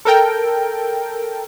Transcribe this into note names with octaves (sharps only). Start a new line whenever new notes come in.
A4 A#4 G5